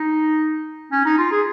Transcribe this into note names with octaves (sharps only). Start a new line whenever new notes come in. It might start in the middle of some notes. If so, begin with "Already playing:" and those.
Already playing: D#4
C#4
D#4
F4
G#4